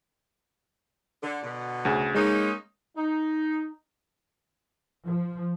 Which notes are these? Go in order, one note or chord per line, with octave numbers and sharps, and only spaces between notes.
D3
B2 D3
D2 C#3
G#3 A#3 C#4 D#4
D#4
F3